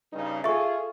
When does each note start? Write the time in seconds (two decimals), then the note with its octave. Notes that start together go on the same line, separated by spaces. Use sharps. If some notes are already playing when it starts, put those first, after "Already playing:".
0.13 G2 C#3 D#4
0.44 F4 G#4 A4 E5 C#6